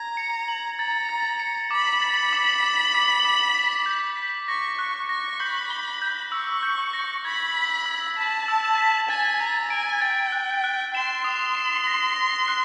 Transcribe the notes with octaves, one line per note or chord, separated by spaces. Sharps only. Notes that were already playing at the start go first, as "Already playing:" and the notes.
Already playing: A#5 G#6
C#7
F#7
A#5 A6
A6
C#7
B5 D6
A6
D6
D6
D6
D6
B6
G6
B6
C#6 A#6
C#6 F#6
C#6 A#6
B5 G6
G7
G6
C#6 E6
G6
A#6
B5 G#6
B6
E6
A5 B6
E6
B6
G#5 A6
A#5 A6
G#5 D7
G5 A6
F#6
F#6
C6 E7
D#6
E7
A#6
A#6
F#6